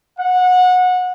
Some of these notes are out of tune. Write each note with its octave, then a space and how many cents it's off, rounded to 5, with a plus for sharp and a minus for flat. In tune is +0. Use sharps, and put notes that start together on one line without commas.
F#5 -25